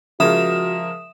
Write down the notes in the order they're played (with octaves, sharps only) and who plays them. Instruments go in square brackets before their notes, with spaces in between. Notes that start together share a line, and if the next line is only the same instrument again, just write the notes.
[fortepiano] C#3 G#3 [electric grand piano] F3 A#4 [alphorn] F#4 [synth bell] E5 D#6 E7